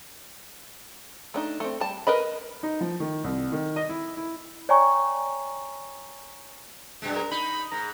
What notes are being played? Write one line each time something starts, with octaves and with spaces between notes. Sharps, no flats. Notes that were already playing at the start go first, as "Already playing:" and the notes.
A3 D4 D#4
A3 C4
G3 A5
A#4 B4 D#5 B5
D#4
F3
D#3
C2
D#3
D#5
E4
E4
C#5 D5 G5 G#5 A#5 C#6
F#2 B2 G#3
A#4
D#4 B5
G#2 A#5